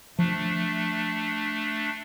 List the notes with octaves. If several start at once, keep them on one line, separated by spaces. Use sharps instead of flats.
F3 A3 D4